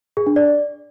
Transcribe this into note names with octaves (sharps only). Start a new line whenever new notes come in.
G#4
D4
D5